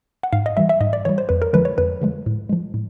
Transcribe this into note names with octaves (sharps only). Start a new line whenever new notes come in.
F#5
G#2 F5
D#5
E3 G3 E5
E5
G#2 D#5
D5
E3 G3 C#5
C5
F2 B4
A#4
D3 F3 G#3 B4
C#5
F2 B4
D3 F3 G#3
A2
F3 G#3
A2